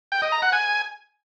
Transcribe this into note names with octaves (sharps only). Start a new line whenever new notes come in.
G5
D#5
A#5
F#5
G#5